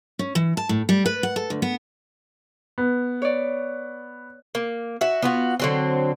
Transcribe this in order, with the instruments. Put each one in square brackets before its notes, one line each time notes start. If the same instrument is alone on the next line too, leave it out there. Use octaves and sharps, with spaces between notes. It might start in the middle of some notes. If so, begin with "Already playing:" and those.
[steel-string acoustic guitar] C#4
E3
A5
A2
G3
B4
F#5
A4
D2
B3
[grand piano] B3
[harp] C#5 D5
[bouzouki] A#3
F#4 E5
B3 F4 F#4
D3 F#3 C4